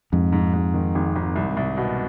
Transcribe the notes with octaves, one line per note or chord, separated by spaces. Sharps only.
F2 G#2
G#2
G#2
D#3
G#1
G#1
C2
C2
B2